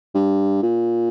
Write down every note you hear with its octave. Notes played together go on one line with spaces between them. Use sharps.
G2
A#2